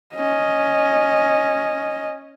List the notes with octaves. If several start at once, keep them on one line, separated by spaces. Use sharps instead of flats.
C#4 D#5